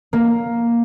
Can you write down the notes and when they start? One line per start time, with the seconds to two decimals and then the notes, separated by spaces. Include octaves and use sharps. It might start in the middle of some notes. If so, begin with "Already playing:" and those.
0.13 A#3